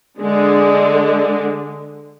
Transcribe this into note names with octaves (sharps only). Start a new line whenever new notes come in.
D3 G#3